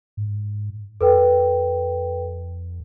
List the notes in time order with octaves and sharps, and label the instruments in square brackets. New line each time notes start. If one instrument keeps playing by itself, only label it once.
[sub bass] G#2
[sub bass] F2 [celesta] A4 B4 G5